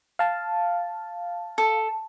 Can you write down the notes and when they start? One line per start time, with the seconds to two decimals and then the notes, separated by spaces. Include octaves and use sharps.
0.19 F5 A5
1.58 A4